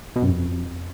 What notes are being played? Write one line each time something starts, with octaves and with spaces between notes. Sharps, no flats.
B2
F#2
F2